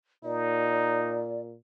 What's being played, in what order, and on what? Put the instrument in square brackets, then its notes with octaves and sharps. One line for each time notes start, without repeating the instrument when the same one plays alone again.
[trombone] A#2 [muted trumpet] D#4 [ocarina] D5